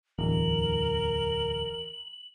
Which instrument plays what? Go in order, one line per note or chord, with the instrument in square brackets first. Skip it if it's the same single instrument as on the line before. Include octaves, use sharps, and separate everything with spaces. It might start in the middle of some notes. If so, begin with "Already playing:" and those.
[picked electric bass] D1 [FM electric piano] E2 [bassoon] A#4 [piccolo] F#7